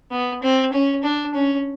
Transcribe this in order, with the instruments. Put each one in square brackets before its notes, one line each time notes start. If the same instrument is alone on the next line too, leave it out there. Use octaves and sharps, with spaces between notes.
[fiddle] B3
C4
C#4
D4
C#4